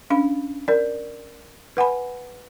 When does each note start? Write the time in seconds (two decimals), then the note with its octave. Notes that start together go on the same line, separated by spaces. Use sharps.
0.10 C#4 D4 F5 B5
0.68 A#4 D5
1.77 B4 F#5 G#5 B5